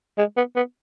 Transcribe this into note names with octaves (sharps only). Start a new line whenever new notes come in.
G#3
B3
B3